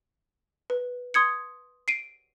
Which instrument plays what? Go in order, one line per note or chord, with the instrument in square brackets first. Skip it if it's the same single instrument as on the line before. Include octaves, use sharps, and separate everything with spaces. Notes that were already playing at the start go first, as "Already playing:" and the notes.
[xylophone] B4
C6 D#6 G#6 C#7
C7 D7 D#7